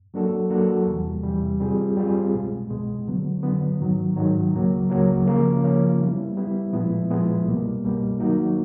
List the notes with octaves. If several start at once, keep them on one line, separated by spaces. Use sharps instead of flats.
F#3 A#3 D4 F#4 A4
F#3 A#3 D4 F#4 A4
E2 C3 E3 G3
E2 C3 E3 G3
G3 C4 F4 G#4
G3 C4 F4 G#4
C2 B2 G#3
C2 B2 G#3
D3 F#3 B3
D3 F#3 B3
G#2 D#3 F#3
G#2 D#3 F#3
C#2 C#3 F#3 A#3
C#2 C#3 F#3 A#3
C#3 F3 A#3 C#4
C#3 F3 A#3 C#4
G3 B3 E4
G3 B3 E4
A#2 F3 G#3 B3 E4
A#2 F3 G#3 B3 E4
C2 B2 G3 A#3
C2 B2 G3 A#3
D#3 F#3 A#3 D#4 F#4